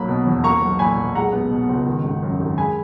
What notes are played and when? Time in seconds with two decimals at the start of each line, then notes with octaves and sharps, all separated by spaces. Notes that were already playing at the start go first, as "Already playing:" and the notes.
Already playing: B1 F#3 A#3 B5
0.08 B2
0.26 E2
0.44 A#3 A#5 C#6
0.62 B1
0.79 A#2 G#5 B5
0.97 B1
1.15 G#3 F#5 A#5
1.33 B3
1.51 B2
1.69 C#2
1.87 D#3
2.04 G#1
2.23 F#2
2.40 G#1
2.58 G#3 G#5 B5